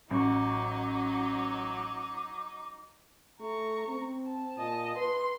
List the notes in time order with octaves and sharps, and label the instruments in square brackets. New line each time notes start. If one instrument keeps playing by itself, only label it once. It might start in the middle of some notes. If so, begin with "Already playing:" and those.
[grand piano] A1 C#6 [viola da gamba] F#3 [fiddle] D#4 [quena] D6
[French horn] A3 [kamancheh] A#5 C#6
[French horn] C4
[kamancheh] A5
[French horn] A#2 [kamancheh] D#5 A5
[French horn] B4 [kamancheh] C6